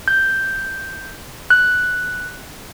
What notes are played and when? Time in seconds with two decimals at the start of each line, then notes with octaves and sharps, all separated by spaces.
0.08 G6
1.50 F#6